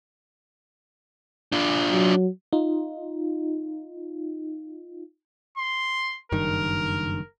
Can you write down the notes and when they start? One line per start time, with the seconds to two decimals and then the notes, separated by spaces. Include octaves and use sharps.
1.52 D4 F4
1.91 F#3
2.53 D#4 F4
5.58 C6
6.32 F#1 G2 D#3 A#4